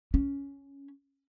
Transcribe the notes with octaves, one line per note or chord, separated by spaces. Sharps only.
C#4